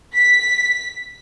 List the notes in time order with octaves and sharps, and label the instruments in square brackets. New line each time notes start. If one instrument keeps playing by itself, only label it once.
[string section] B6